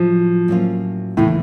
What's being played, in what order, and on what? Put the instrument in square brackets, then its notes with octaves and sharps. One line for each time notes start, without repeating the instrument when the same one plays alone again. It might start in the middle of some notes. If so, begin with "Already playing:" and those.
Already playing: [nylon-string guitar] A2 F#3 A3 [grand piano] F3
[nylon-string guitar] A2 F#3 A#3 C#4 F4
[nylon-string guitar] D#2 C#3 E3 A3 [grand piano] A2